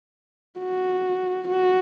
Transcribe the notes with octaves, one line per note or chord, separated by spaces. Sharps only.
F#4
F#4